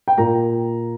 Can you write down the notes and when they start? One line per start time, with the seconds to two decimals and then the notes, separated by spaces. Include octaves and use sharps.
0.08 G5
0.18 A#2 A#3 A#5